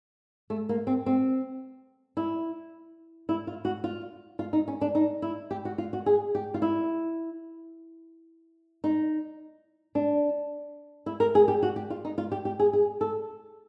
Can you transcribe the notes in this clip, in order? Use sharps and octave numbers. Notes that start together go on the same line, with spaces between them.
A3
A#3
C4
C4
E4
E4
F4
F#4
F4
F4
D#4
C#4
D4
D#4
E4
G4
F#4
F4
F#4
G#4
G4
F4
E4
D#4
D4
E4
A#4
G#4
G4
F#4
G4
F4
D#4
F4
G4
G4
G#4
G#4
A4